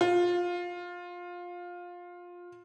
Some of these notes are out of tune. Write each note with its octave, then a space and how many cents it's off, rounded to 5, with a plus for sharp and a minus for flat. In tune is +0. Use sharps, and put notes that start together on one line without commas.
F4 +15